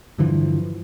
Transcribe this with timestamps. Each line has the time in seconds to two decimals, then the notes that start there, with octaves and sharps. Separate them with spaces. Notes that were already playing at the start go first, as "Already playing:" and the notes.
0.18 G2 D3 E3 F3